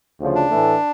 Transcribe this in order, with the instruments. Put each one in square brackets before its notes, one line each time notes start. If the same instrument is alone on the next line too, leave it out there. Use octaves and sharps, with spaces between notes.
[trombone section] D2 C#3 F3
[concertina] D4
[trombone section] A2 E3 A3